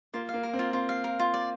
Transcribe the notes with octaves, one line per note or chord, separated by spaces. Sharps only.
A#3 F4
F5
A#3
A#4
C4
F4
C4 F4
F5
A#4
F4
D5